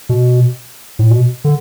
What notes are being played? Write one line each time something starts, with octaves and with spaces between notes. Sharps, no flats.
B2
A2
B2
D3